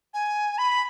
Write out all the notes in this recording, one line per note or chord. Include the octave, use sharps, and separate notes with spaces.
G#5
B5